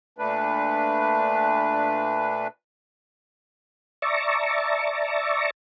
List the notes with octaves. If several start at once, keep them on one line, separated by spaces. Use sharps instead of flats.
A#2 A3 D4 B4
D5 E5 A5 A#5 C#6